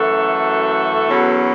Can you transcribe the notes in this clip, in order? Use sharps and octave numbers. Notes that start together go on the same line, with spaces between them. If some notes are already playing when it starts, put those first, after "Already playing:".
Already playing: F#2 E3 A3 F#4 A4
E2 B2 F#3 C#4